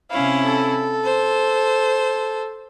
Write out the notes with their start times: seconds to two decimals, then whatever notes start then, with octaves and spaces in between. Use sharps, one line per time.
0.10 C3 C#4 E4 F5
0.44 A4
1.04 C5